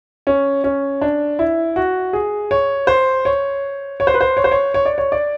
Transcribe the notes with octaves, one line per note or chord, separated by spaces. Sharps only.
C#4
C#4
D4
E4
F#4
G#4
C#5
C5
C#5
C#5
C5
B4
C5
C#5
C5
C#5
C#5
D5
C#5
D5